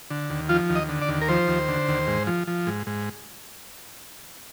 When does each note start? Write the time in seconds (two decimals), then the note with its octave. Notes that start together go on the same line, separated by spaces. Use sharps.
0.10 D3
0.30 D#2
0.49 F3 F4
0.70 D#2
0.76 D#5
0.89 D3
1.02 D5
1.09 D#2
1.21 A#4
1.28 F3 C5
1.48 D#2
1.69 D3
1.88 D#2
2.07 G#2
2.27 F3
2.47 F3
2.67 G#2
2.87 G#2